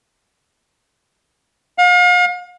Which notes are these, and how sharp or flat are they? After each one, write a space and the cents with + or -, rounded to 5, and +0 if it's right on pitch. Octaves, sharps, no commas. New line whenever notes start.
F5 +40